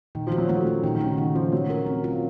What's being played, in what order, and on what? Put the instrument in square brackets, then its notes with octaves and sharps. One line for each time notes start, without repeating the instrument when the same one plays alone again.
[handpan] A#2 [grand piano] D#3
[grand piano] F3 [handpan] F#4
[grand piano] F#3
[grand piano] F#3 [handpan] A3
[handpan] C#4
[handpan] A#2 [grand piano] D#3
[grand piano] D#3
[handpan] F#4
[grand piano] C#3
[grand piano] D#3 [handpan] A3
[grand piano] F3 [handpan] C#4
[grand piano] F#3 [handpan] A3
[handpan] A#4
C4
F4